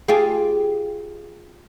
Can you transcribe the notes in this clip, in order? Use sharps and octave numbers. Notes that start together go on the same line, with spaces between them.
F4 G4 G#4